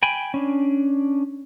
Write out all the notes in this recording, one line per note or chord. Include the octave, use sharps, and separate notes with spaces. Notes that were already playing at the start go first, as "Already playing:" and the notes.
G5 G#5 B5
C#4 D4